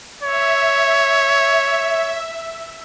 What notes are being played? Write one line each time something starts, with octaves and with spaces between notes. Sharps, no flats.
C#5 E5